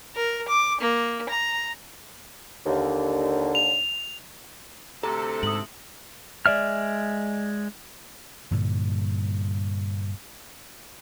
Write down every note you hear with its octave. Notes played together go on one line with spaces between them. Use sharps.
A#4
D6
A#3
A#5
D#2 D3
F7
D2 C3 A4 A#5
G#2 D#6 F#7
G#3 D5 E5 F6
G2 A#2 D3 G3